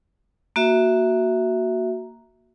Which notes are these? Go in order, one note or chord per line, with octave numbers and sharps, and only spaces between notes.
A#3 F#4 E5